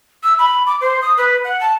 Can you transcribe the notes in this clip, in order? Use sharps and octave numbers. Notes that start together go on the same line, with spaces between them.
E6
B5
D6
C5
D#6
B4
F#5
A5